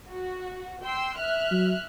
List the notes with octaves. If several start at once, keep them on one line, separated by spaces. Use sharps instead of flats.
F#4
G5 C6 E6
E5 F6 F#6
F#3